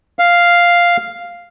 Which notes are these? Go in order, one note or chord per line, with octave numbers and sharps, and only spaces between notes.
F5